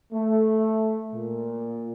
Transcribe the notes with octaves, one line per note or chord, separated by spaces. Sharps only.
A3
A#2